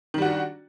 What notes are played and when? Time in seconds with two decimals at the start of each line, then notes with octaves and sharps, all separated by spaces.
0.14 D#3
0.18 G3
0.22 F#4
0.26 D4